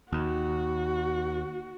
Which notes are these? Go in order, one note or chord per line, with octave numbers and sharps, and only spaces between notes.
D#2 F#4